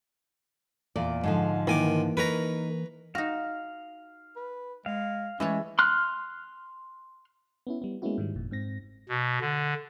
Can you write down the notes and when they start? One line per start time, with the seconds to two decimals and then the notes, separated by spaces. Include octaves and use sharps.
0.96 E2 A#2 D5
1.23 G#2 D3 F3
1.67 D#3 E3 A#3 G#5 D6
2.17 D#4 A#4 B4 C#5 A#5
3.15 D#4 F#4 F5
4.36 B4
4.86 G#3 F5
5.40 E3 G#3 A3 C#4 C#5
5.79 C6 F6 F#6
7.67 B3 C#4 E4
7.82 G3 B3
8.02 G#3 A#3 B3 C#4 E4 F#4
8.18 G#2 D#3 G3
8.35 G1 F2 A#2
8.51 G#2 C4 A#6
9.09 B2
9.41 D3